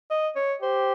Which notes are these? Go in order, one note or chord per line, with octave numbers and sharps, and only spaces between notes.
D#5
C#5
G4 C5